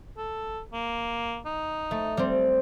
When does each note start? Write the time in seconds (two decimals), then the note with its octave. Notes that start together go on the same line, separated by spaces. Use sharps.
0.17 A4
0.73 A#3
1.46 D#4
1.91 A3
2.17 G3 C4